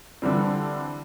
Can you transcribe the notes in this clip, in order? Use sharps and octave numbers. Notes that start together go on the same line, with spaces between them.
D3 E3 G3 C4